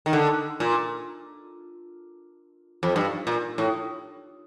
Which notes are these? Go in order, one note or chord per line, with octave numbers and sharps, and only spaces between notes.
D#3
D3
A#2
F2
G2
A#2
A2